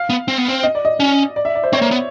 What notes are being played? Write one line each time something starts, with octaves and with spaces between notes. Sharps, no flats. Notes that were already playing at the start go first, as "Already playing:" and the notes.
Already playing: F5
B3
C4
B3
C4
D#5
D5
D#5
C#4
D5
E5
D5
C5
C4 C#5
A#3
B3